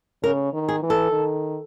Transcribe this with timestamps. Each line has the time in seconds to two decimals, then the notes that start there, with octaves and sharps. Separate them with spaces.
0.23 C#3 A#4
0.53 D#3
0.69 G#4
0.83 E3
0.90 A4
1.12 D#3